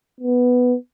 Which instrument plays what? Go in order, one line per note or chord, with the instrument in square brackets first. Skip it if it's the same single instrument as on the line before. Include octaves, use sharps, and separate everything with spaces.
[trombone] B3